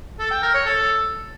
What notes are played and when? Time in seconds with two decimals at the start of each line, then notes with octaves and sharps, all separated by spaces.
0.19 A4
0.31 G5
0.43 A#4
0.54 C#5
0.66 A4